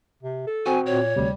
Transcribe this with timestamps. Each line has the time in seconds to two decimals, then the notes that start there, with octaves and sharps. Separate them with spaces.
0.23 C3
0.47 A4
0.66 C4 F#4 G#5
0.86 A#2 C#5
1.16 D2 C3 G3